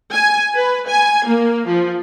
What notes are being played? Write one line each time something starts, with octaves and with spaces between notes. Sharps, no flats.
G#5
B4
G#5
A#3
F3